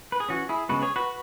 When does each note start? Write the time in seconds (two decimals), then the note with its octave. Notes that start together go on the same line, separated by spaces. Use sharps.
0.12 B4
0.20 G#4
0.28 E3 C#4 F#4
0.49 E4 G#4
0.69 C#3 G#3 B3 F#4 B4
0.81 G#4 C#5
0.96 F#4 B4